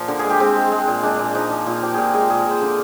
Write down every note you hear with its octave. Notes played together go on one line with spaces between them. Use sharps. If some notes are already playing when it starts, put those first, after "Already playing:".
Already playing: A#2 F3
D3 A#4
G#4
G#3
G4
G#3 C4
G#3
G#3
A#2
G#3 D4
A#2
F3 D#4
F3
A#2 F4
F3 G4
A#2 G#4 A#4
G#3 G#4
A#2 G#4
A#4
A#2
C5
D3 D5